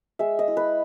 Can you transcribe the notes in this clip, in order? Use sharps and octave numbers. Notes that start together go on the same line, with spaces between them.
G#3 E5
D#5
E4
B4